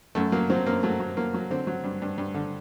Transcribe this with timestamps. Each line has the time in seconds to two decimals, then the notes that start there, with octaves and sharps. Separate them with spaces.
0.15 F#2 A3
0.32 F#3 A#3
0.50 F#3 C4
0.66 F#2 A#3
0.83 F#3 A3
1.00 F#3
1.17 F#3 A#3
1.34 F#3
1.50 D3 C4
1.67 F#3
1.84 G2
2.02 G2
2.18 G2
2.34 D3